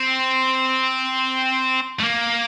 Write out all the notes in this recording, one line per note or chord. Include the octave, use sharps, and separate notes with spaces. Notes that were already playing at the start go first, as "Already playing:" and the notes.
Already playing: C4
A3
A#3